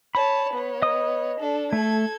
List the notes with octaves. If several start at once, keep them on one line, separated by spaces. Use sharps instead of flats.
C#5 A5 B5
B3 C#5
D#5 D#6
D4 A4
A3 A4 G#6